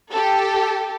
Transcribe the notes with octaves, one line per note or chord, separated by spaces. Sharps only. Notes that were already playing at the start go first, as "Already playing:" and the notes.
G4 A4